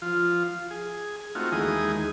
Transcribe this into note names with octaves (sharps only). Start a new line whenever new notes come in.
F3 F4
G#4
A3 C4 D#4 F4 F#4
D#2 E3 G#3 D#4 G#4 D#6